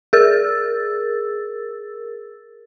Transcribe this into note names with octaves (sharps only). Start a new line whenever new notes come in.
G#4 A#4 E6 A6